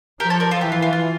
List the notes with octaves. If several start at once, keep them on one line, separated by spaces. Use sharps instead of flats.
F3 G4 A#4
A4 C#5
A#4 D5
F4 A4
E3 G4
F4
F4
F4